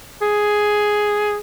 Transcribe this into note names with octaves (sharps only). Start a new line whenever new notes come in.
G#4